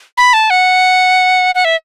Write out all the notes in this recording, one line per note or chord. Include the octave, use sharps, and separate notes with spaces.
B5
A5
F#5
F#5
E5